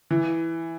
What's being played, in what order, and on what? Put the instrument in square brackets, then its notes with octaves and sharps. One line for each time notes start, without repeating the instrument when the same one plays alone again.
[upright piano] E3